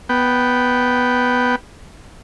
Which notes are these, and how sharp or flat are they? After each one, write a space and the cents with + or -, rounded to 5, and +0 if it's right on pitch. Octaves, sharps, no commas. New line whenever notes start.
B3 +0 G5 -10